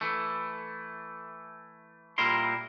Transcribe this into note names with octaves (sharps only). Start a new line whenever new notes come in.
E3 A3
A#2 G3 E4 A#4 C6